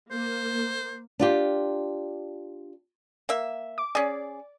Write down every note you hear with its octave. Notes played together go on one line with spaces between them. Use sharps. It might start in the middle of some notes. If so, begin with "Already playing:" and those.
A#3 C5
D4 F4 G4
A#3 E5
D6
C#4 G#4 D5